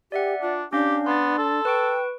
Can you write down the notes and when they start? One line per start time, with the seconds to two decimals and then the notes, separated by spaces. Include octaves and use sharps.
0.12 G4 D5 E5 F#5
0.42 D4 F4
0.73 C#4 D4 G4 F5
1.06 B3 C6 A6
1.38 A4
1.65 B4 G5 C#6 D7